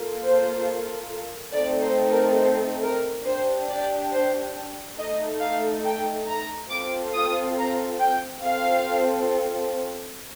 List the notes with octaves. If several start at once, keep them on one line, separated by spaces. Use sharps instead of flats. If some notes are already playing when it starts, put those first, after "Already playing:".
Already playing: A#3 F4 A4
C5
A3 C4 D#4 A4 D5
C5
A#4
C5
A#4
D4 G4 C5
D5
C5
A3 D#4 A4 D#5
F5
G5
A#5
C4 F4 A4 D6
D#6
A#5
G5
C4 F4 A4 F5